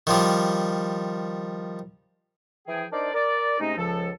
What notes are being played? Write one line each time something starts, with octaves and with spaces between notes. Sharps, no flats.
D#3 F3 G3
E3 F3 G#4 G5
D4 D#4 A#4 C5 D5
A#4 D5
C3 G#3 A3 C#4 D#4
C#2 F3 A4